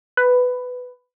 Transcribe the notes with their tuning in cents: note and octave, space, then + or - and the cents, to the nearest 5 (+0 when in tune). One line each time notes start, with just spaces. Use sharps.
B4 +10